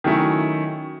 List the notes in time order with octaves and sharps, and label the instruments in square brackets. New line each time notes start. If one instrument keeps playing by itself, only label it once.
[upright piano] D#3 F#3 A3 C#4 E4